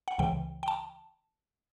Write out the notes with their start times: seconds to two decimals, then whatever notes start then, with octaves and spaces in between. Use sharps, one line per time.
0.08 F#5
0.19 C#2 C#3 E3 G5
0.63 G5
0.68 A5